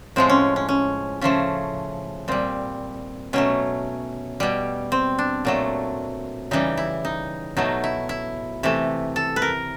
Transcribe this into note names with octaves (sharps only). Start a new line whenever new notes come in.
A2 F3 G#3 C4
C#4
C#4
C#4
C#3 F3 A3 C#4
A#2 G3 C4
B2 F#3 A3 C#4
B2 G3
C4
D4
A#2 F#3 A3
C#3 E3 G3 D#4
E4
D#4
B2 F#3 A3 D#4
E4
E4
C3 E3 A3
A4
B4
A#4